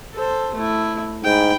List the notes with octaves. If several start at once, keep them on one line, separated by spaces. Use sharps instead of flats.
A4 C5
A3 E4
G#2 G5 B5